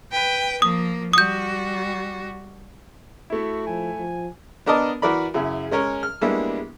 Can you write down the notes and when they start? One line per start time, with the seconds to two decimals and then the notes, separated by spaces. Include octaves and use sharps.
0.12 B4 G5
0.62 F3 A#3 D#6
1.13 G3 F#4 D#6 G6
3.30 A3 E4 F#4
3.67 F3 G#5
3.99 F3
4.66 B3 D4 A#4 D5 D#5 A5
5.02 E3 F#4 A#4 D5 B5
5.34 F#2 C#3 E4
5.71 G#3 C#4 A#4 C#5
6.03 F6
6.21 G3 G#3 A#3 B3 D4 E4